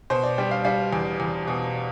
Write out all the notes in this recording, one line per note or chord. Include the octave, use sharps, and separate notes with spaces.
B2 C5
D5
G3 G5
F5
G3 F5
E2
E2
B2